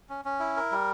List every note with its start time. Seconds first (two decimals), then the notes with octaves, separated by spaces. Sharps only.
0.09 C#4
0.25 C#4
0.40 E4
0.57 A#4
0.72 G3